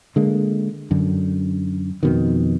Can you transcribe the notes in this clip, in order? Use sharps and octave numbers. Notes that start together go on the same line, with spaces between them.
D3 G#3 A#3
F#2 D3
F2 B2 D#3